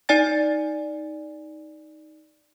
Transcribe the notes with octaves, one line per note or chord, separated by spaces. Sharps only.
D#4 D5 G#5 A6